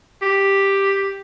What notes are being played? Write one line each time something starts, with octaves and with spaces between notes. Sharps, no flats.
G4